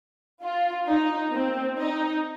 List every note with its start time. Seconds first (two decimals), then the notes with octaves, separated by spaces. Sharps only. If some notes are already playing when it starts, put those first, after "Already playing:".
0.42 F4
0.88 D#4
1.33 C4
1.78 D#4